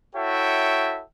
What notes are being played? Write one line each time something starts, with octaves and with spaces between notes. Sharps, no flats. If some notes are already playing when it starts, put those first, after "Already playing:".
E4 F#4 A4 C#5 E5 G5